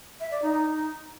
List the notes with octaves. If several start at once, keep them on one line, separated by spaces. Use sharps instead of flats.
E5
D5
D#4
D#4